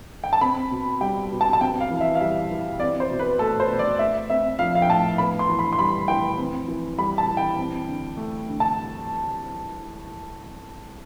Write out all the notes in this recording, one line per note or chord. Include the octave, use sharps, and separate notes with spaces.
G5
A5
C4 B5
B2
G3 G5
B2
A5
A5
C4 G5
F5
E3
E5
F5
G3 E5
E3
C4 D5
C5
B2
B4
A3 A4
C5
B2
D5
A3 E5
C4 E5
F3 F5
F5
G5
A2 A5
B3 B5
C6
E3
B5
C6
G3 B5
E3 G5
C4
E3
G3 B5
A5
E3
G5
C4
D3
A3
D3
A5